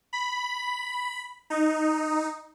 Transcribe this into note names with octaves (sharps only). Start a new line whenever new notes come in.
B5
D#4